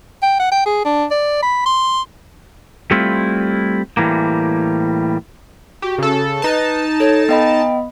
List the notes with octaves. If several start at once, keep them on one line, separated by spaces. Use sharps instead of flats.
G5
F#5
G5
G#4
D4
D5
B5
C6
G3 A3 C4 E4 F4
A2 E3 G3 A#3
F#4 G4
C#3 A4
D#4 B4 A5
A4 C#5
B3 D#5 G5 B5